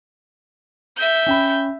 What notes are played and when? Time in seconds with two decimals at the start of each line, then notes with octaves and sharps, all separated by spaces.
0.97 E5 G6
1.26 C#4 G5 B5